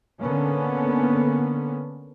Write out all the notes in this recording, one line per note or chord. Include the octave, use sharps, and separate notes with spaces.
D3 A#3 B3 C#4